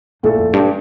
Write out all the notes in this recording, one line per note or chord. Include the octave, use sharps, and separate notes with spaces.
G2 A#2 A3 E4 A4
F2
G2